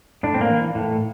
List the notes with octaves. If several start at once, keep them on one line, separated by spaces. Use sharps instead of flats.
A2 D4
C4
A#3
E3
A2